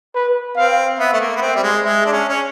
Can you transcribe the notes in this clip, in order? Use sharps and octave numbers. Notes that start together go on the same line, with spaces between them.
B4
C4 F5
B3 E5
A3
A#3
B3
C4 E5
G3
G#3
G#3 E5
D4
C#4
C#4